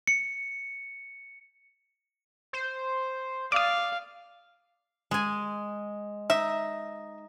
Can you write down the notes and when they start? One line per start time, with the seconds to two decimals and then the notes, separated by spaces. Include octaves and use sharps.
0.07 C#7
2.53 C5
3.52 D5 F5 D6 D#6
5.11 G#3 G#5
6.30 D#4 E5